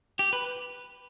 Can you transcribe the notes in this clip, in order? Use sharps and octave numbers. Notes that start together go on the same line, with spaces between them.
G4
B4